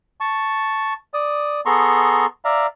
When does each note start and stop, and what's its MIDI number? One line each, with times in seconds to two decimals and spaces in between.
0.20 0.93 81
0.20 0.93 85
1.14 1.61 74
1.14 1.61 87
1.66 2.26 59
1.66 2.26 68
1.66 2.26 69
1.66 2.26 82
1.66 2.26 84
1.66 2.26 85
2.45 2.67 74
2.45 2.67 76
2.45 2.67 77
2.45 2.67 82